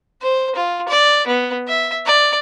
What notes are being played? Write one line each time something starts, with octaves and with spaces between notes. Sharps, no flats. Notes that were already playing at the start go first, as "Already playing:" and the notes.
C5
F4
D5
B3
E5
D5